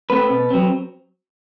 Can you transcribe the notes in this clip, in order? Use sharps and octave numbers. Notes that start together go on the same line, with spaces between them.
A3 C4 B4
B2
F#3 C4